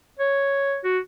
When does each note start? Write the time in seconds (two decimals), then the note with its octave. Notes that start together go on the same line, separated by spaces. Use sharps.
0.19 C#5
0.84 F#4